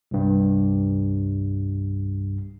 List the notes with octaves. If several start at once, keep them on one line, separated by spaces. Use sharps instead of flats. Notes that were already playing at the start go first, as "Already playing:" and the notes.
C2 G2